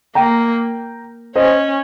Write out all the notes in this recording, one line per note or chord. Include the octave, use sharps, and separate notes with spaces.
A#3 G5 A#5
C#4 C5 D#5